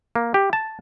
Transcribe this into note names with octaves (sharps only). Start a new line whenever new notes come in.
A#3
G4
A5